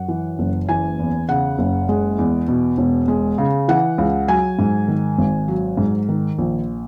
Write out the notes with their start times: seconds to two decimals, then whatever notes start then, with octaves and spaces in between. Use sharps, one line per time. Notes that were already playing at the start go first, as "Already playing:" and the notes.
Already playing: F#2 F#5
0.08 E3
0.39 F#1
0.69 E3 G#5
0.99 E2
1.29 C#3 F#5
1.58 F#1
1.89 G#3
2.18 E2
2.48 B2
2.78 E1
3.08 G#3
3.38 C#3
3.68 E3 F#5
3.98 C#2
4.28 F#3 G#5
4.59 G#2
4.88 D#3
5.18 G#1
5.48 F#3
5.77 G#2
6.09 D#3
6.38 A#1